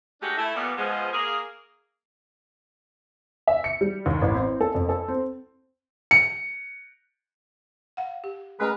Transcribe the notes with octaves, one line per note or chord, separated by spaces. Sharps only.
G#3 A3 D4 D#4 F#4 G4
A3 E4
A#2 G3 B3
B2 F3 G#3
A#3 G#4
E5
C#7
G3
D#2
A1
C4
A4
F2
A4
C4
C#7
F5 F#5
G4
G#3 A3 C#4 A#4 B4